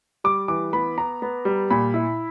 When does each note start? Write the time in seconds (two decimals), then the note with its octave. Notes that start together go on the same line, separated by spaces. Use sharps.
0.24 G3 D6
0.48 E3 D6
0.73 B3 B5
0.98 B3 A#5
1.22 B3
1.45 G3
1.70 A#2 B5
1.94 E4